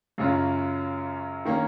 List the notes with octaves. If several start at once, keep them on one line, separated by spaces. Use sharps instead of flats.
F#2 C#3 G#3 C#4 F4
D#3 A#3 C#4